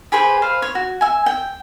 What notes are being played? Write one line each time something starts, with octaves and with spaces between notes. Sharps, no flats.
G4 G#4 B4 C5
B4 C5 F5
C#5
F#4
E5 G#5
G5